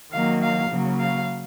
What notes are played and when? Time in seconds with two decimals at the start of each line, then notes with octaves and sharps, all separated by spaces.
0.12 D#3 F#3 A#3 F5
0.41 F5
0.70 C#3 F#3 A#3
0.99 F5